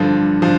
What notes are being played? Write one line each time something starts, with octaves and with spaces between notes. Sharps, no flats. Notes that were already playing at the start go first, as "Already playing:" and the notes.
Already playing: G2 D3 F3 A4
D3 F3